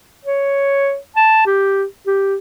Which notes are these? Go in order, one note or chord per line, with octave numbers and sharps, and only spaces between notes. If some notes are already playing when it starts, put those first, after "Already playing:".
C#5
A5
G4
G4